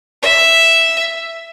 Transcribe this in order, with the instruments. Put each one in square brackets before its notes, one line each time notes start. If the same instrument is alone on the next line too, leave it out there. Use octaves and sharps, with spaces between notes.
[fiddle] E5